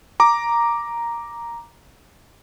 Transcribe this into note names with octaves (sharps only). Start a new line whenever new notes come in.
A#5 D6